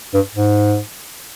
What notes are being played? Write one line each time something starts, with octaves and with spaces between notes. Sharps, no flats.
G2
G#2